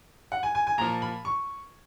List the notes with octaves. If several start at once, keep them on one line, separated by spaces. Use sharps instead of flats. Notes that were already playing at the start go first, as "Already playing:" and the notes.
F#5
G#5
G#5
G#5
A#2 F3 A#5
B5
C#6